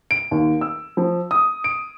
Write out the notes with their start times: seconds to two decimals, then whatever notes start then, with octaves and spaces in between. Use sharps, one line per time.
0.11 D7
0.31 D#2
0.61 E6
0.97 F3
1.31 D#6
1.64 D7